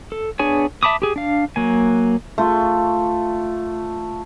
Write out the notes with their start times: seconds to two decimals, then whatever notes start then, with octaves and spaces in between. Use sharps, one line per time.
0.12 A4
0.39 B3 D4 G#4 C#5 G#5
0.83 E5 A5 B5 D6 D#6
1.02 G4 G#4
1.16 D4 F5
1.56 F#3 A#3 G#5
2.38 A3 F4